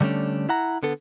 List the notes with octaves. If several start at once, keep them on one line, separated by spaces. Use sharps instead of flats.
D3 G3 A3 C#4 D4
E4 F#5 A#5
D3 B3 A4